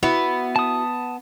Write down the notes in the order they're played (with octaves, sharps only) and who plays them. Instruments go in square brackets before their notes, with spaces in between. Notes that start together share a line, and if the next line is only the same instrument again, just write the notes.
[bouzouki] B3 [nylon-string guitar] E4 F#4
[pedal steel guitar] A5 D#6